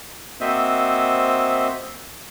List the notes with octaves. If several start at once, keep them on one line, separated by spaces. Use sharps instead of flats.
A#3 C4 F#4 C5 D#5 E5